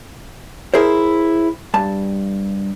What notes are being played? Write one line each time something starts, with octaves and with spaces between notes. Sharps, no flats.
E4 G#4 A#4 C5
G2 A5